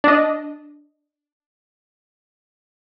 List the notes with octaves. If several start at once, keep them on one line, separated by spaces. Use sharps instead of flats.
D4 D#5